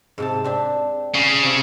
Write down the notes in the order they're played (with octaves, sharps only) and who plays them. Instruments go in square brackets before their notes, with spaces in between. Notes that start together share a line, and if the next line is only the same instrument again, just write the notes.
[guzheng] G#2 C3 A5
C4 D4 G4
[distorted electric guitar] C#3
[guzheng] C3 F4